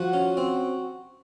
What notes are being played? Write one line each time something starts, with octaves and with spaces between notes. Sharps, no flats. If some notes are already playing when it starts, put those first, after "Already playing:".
Already playing: F3 F#4
C#4
C4